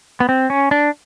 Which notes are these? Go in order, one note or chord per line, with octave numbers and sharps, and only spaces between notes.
B3
C4
C#4
D4